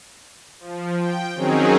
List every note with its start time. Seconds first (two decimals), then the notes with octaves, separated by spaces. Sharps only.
0.60 F3
0.98 G5
1.35 D#3 F#3 C4 C#4 D#4 G#4